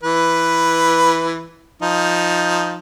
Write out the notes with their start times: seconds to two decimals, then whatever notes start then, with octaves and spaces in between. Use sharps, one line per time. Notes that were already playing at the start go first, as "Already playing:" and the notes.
0.03 E3 B4
1.82 F3 D#4